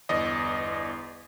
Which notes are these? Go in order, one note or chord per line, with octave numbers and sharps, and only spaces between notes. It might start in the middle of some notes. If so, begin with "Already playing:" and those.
G1 E2 D5 D#5